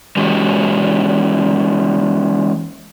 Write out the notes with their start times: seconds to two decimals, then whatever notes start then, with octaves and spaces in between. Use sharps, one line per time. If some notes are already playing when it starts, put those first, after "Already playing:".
0.17 E3 G#3 C#4 F#4 G4